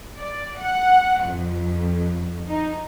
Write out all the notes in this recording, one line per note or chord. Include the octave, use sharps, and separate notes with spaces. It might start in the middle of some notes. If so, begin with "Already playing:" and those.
D5
F#5
F2
D#4